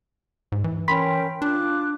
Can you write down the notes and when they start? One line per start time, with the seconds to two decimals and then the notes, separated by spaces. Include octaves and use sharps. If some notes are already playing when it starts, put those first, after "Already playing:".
0.52 G#2
0.64 E3
0.88 C#4 A#4 G5 B5 C6 B6
1.42 D4 F4 D6 F#6